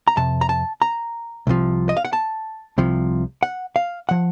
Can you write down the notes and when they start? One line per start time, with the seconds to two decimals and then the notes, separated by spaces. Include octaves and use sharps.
0.08 A#5
0.17 F2 C3 A5
0.41 A#5
0.49 A5
0.82 A#5
1.47 C2 C3 F3
1.89 D#5
1.97 F5
2.05 F#5
2.13 A5
2.78 C2 C3 F3
3.43 F#5
3.76 F5
4.09 F3 F#5